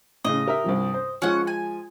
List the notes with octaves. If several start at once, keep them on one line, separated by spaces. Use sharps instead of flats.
A2 C#3 D#5
G4 A#4 E5
C2 G2 F3
C5
F3 G#3 C#4 F4 F#5
G#5